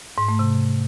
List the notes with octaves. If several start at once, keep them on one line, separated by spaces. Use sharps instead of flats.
G#2
A3
C3